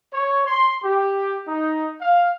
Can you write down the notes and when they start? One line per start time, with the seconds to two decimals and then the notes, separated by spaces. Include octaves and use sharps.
0.13 C#5
0.45 C6
0.84 G4
1.46 D#4
2.01 F5